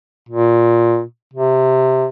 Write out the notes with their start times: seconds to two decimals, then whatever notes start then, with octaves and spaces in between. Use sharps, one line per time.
0.29 A#2
1.34 C3